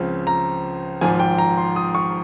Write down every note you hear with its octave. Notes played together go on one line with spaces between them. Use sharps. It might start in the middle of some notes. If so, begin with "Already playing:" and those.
Already playing: C#2 C#3 F3 C4
A#5
G#1 G#2 F3 G#5
G5
A#5
C6
D#6
C#6